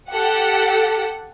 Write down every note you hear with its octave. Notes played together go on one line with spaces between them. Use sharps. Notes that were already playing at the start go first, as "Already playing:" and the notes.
G4 A4 F#5